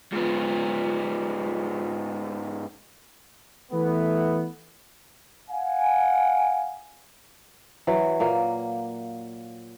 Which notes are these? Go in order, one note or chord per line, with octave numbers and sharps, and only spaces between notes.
G#2 B3 F4
E3 A3 B3
F5 F#5 G#5
E3 F#3
A#2 A#3